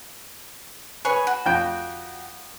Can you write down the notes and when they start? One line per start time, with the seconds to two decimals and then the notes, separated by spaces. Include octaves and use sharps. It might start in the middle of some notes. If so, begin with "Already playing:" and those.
1.05 G#4 B4 C#5 C#6
1.27 F#4
1.46 F2 G5